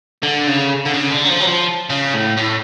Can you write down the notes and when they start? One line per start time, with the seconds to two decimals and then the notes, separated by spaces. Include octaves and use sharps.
0.23 D3
0.47 C#3
0.86 D3
0.94 C#3
1.12 D3
1.25 F#3
1.30 F3
1.41 F#3
1.48 F3
1.90 C#3
2.14 A2
2.37 A2